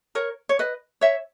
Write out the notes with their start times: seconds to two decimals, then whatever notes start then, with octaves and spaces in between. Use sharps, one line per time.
0.15 A#4 C#5
0.49 C#5
0.59 B4 D#5
1.01 C#5 E5